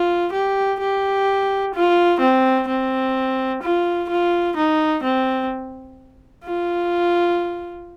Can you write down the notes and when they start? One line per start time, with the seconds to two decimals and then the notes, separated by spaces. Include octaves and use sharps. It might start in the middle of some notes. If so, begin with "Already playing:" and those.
Already playing: F4
0.33 G4
0.80 G4
1.75 F4
2.20 C4
2.68 C4
3.63 F4
4.09 F4
4.56 D#4
5.03 C4
6.44 F4